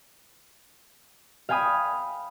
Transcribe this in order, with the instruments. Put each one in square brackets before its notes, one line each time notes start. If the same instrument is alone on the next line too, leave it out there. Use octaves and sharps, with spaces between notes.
[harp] F5 G5 G#5 B5 D#6